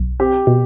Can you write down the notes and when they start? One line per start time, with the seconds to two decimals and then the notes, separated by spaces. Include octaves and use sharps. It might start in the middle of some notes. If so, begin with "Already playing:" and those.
Already playing: B1
0.20 C4 G4
0.47 B2